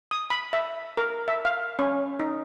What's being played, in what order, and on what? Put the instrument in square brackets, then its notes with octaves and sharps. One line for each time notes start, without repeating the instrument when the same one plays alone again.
[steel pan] D#6
B5
E5
A#4
E5
F5
C#4
D#4